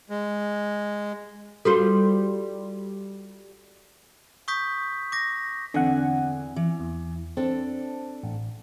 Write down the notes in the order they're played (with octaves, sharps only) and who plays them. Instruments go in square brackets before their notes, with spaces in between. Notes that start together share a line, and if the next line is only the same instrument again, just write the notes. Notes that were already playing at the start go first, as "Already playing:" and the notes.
[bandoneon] G#3
[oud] G3 F4 C5 [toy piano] F#4 A4
[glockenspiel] C#6 D#6 G6 B6
D6 A#6
[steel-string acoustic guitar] E2 C4 G#5 [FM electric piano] D3 F#5
[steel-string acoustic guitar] E3
[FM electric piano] E2
[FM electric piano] C4 [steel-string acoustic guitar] D4 A4
[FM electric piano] A1